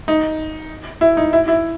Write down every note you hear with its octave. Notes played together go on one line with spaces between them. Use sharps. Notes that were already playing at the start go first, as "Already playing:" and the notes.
D#4
E4
D#4
E4
E4